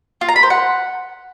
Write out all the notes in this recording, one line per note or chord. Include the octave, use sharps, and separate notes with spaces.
F4
A#5
B5
C5
F#5